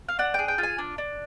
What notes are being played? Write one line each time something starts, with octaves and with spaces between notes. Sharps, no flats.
F5
D4 F#5
G#4 G5
G5
F4
G#5
D4
D4